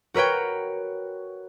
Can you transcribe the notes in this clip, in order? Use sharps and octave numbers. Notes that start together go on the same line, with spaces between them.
F#4 A#4 B4 C#5 G5